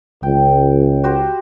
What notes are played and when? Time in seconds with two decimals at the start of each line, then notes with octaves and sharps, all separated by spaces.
0.23 C#2 G5
1.04 F#4 G4 C5